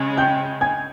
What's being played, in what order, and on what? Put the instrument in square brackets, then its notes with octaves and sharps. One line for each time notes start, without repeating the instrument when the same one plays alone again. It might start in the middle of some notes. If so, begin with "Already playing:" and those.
Already playing: [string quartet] C#3 G#3 C#4
[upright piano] G5 G6
G#5 G#6